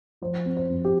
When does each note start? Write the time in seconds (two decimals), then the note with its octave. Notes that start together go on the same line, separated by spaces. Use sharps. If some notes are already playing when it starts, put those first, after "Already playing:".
0.22 F3 C5
0.45 C4
0.57 C5
0.70 F2
0.85 G4